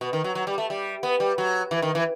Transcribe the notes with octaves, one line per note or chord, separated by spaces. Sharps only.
B2
D#3
F#3
F#3
G3
A3
G3
B3
G3
F#3
E3
D#3
E3